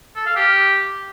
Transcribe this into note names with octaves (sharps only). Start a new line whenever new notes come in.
A4
F5
G4